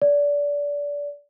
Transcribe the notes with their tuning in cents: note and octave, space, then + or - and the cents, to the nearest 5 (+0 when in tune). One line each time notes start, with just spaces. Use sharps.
D5 -25